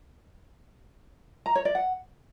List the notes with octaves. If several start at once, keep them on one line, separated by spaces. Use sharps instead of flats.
A#5
C#5
D5
F#5